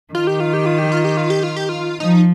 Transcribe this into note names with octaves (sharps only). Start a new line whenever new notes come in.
D#3 F4
G4
F4
G4
F4
G4
F4
G4
F4
G4
F4
G4
F4
F3 D#4